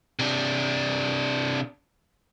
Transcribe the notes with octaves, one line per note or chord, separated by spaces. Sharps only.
C3 D4